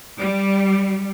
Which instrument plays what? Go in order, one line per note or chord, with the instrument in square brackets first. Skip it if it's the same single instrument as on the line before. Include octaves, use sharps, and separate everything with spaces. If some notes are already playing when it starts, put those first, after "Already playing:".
[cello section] G3